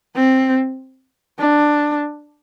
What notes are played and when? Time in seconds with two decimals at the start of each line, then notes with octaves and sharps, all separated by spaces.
0.15 C4
1.39 D4